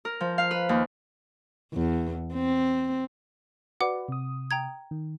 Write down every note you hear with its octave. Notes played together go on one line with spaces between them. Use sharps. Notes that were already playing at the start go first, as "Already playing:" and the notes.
A#4
F3
F5
B4
D#2
E2
C4
F#4 B4 D5 F#5 D6
C3 D#6
G5 A#5 G#6
D#3